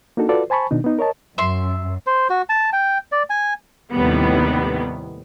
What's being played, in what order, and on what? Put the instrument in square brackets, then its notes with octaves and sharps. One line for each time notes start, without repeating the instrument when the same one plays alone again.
[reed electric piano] A#3 D4 D#4 F#4 A4
F4 F#4 A4 B4 D5
C5 G#5 A5 B5 C#6
B2 D#3 D4 D#4
B3 D#4
A#4 C#5 D#5 A5
[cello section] F#2 [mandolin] E5 C6
[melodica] C5
F#4
A5
G5
D5
G#5
[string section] D#2 A2 C3 D#3 G3 B3